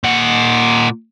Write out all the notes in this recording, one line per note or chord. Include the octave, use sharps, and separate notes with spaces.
A#2 F#5